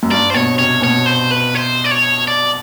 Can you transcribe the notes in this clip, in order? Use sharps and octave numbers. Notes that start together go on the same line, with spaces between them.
F#2
G2 D5
C5
B2 C#5
C3 C#5
B2 C#5
C5
B4
C5
D5
C#5
D5